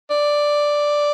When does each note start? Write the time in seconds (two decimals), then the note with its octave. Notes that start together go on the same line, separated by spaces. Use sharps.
0.10 D5